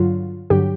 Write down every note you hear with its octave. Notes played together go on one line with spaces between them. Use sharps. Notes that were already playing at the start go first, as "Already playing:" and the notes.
Already playing: G2 D3 F#3 F4
G2 D3 F#3 G4